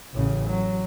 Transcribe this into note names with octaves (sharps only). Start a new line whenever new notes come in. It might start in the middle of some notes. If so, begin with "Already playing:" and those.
A1 C#3
F#3